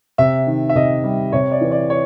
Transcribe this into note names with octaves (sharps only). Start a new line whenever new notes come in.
C3 E5
D#3
E5
C3 D#5
G3
C3 C#5
D5
E3
D5
C#5